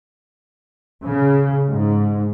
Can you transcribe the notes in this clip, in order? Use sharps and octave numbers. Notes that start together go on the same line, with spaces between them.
C#3
G#2